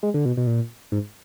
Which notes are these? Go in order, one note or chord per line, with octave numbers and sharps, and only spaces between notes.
G#3
D3
B2
B2
A#2
G#2